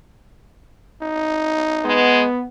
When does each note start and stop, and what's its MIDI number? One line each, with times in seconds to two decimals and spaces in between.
1.02 2.04 63
1.85 2.25 56
1.85 2.44 59